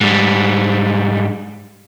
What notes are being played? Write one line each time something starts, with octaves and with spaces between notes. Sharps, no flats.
G#2 G3